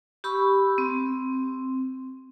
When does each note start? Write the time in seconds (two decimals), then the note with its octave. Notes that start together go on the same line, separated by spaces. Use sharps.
0.24 G4 B5 C#6 E6
0.78 C4